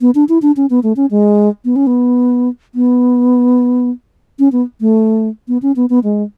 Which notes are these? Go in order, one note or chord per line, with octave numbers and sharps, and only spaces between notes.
B3
D4
E4
D4
C#4
B3
A3
C#4
G#3
B3
C#4
B3
B3
C#4
B3
A3
B3
C#4
B3
B3
G#3